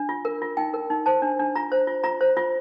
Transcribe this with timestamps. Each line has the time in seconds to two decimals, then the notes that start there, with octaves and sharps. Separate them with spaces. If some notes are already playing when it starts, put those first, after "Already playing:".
Already playing: D4
0.09 F4
0.25 A#4
0.42 F4
0.57 D#4 G5
0.74 A#4
0.90 D#4
1.06 C5 A5
1.22 D4
1.40 D4
1.55 F4 A#5
1.72 C5
1.87 F4
2.04 F4 A#5
2.21 C5
2.37 F4